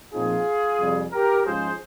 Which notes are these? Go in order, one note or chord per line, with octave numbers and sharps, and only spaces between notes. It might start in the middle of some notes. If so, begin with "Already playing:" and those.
A#2 F3 C4 D#4 F4 G#4
F2 C3 G3
G4 A#4
G#2 F3 G#3 C#4 F4 G#4 C5